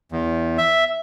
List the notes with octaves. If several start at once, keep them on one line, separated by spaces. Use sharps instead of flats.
E2
E5